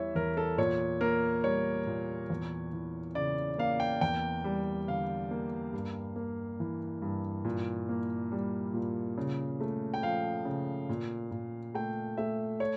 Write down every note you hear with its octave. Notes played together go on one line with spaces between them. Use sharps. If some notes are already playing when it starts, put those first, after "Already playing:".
Already playing: E2 E3 G3 C#5 E5
E2 A#4
A4
A#2 C#5
A#3 A#4
G3 C#5
A#2
E2
E3
C#3 D5
A#3 F5
G5
E2 G5
G3
D3 F5
A#3
G2
A#3
E3
G2
A#2
A#3
G3
A#2
C#3
A3
G5
F3 F5
C#3
A#2
A#2
A3 G5
A3 E5
C#5